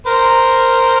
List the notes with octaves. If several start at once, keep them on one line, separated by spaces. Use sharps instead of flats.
A#4 C5